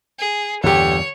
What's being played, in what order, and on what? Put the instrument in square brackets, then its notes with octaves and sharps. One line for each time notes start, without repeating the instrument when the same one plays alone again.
[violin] G#4
[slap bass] E2 G2 A#2 [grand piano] D3 G4 [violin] C#5